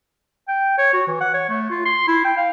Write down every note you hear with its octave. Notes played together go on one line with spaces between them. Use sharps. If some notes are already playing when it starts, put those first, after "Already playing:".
G5
C#5
F#4
E3
F#5
C#5
A3
F4
C6
E4
G5
F5